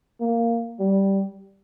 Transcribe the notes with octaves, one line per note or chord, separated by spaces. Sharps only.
A#3
G3